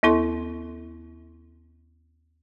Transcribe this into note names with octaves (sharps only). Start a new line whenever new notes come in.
D#2 B3 E4 A4 C6